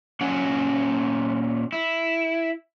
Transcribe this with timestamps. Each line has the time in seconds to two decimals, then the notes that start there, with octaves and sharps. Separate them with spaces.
0.21 A#2 C#4 F4 F#5
1.72 E4